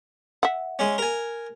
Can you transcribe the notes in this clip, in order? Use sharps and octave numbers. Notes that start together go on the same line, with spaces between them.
E5 F#5
G#3 C#4
A#4 G#5